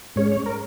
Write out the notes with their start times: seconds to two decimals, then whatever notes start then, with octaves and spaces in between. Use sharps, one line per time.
0.16 G#2 G#3 C#4 C#5
0.32 C#5
0.46 A#4